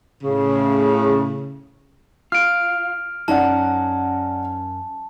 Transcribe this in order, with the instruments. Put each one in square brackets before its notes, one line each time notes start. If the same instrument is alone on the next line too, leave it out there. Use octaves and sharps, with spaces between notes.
[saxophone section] A2 C#3
[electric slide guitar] F4 [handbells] F6 D7
[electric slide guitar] F#2 C#4 [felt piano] D#4 D5 F#5 [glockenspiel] A5